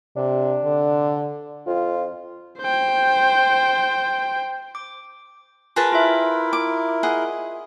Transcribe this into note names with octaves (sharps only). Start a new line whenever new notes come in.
C3 D4
D3
F2 F4
C5 G5
D6
F4 G#4 A#4 B4 A5
E4 F4 A#4 E5
D6
G#4 D#5 F#5